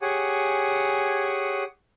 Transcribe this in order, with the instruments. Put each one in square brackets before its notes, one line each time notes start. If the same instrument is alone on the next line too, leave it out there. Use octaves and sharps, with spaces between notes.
[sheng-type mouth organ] G4 G#4 C#5 F#5 G#5